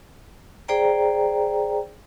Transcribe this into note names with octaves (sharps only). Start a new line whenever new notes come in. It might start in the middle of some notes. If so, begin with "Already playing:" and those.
G#4 C5 D5 G5 A#5